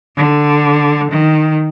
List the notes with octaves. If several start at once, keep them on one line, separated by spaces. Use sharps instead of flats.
D3
D#3